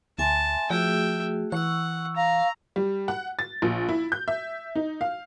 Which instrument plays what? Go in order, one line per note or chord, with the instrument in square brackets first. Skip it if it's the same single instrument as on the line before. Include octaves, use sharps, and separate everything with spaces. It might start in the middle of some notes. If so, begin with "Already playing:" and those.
[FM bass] D2 [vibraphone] E5 G#5 C6 [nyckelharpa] A5
[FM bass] F3 [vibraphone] A3 F#4 G#4 [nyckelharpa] E5 G5
[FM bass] E3 [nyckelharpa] F#5 [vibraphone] C#6 E6
[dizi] F5 [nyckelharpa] A#5
[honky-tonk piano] G3
F#5
A6
A#1
E4
G6
E5
D#4
F5